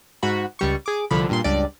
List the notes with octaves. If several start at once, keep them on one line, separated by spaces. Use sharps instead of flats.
G#2 F#4 B5
C#2 G3 C#6
G#4 D6
C2 D3 F3 B5
G2 A#2 C6
C#2 G2 D5